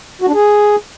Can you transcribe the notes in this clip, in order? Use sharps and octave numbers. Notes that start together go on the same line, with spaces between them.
F#4
D4
G#4